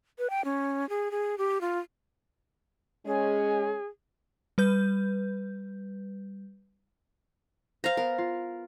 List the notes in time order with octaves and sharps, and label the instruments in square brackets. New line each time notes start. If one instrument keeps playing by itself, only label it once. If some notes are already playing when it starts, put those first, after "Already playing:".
[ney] B4
G5
C#4
G#4
G#4
G4
F4
[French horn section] G#3 C#4 [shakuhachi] G#4
[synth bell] G3 B4 G6
[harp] C5 A6 [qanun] F5 A#5
[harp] B3 [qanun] A#4
[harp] F4